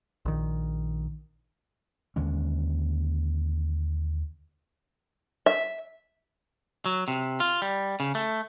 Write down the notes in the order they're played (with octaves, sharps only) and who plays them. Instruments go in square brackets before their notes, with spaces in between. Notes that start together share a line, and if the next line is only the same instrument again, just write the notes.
[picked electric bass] A#1 D#3
[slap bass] D#2 D3 G#3 C#4
[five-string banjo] E5
[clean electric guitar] F#3
C3
F4
G3
C#3
A3